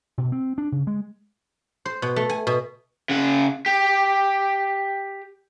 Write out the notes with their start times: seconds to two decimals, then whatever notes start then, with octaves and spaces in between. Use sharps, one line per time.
0.18 B2
0.32 C4
0.58 D4
0.72 C#3
0.87 G#3
1.85 C5
2.02 B2
2.16 A3
2.29 G#5
2.47 B2
3.09 C#3 F#5
3.66 G4